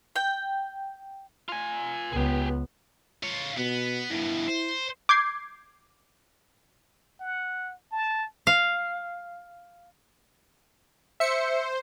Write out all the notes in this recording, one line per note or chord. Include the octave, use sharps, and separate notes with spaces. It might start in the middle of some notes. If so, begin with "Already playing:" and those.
G5
F4 G#5
C#2 B3 G4 G#4
F4 C#5
B2 B3
G2 B2 E4
C5
D6 G6 G#6 C7
F#5
A5
F5
C5 E5 C#7